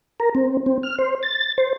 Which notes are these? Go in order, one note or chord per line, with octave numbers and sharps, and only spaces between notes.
A#4
C4
C4
F6
C5
A6
C5